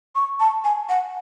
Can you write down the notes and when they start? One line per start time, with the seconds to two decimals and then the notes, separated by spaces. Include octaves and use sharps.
0.15 C#6
0.40 A5
0.64 G#5
0.89 F#5